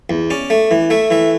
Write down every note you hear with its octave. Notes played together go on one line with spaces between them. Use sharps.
E2
C#4 D5
A3
E3
A3 E5
E3 E5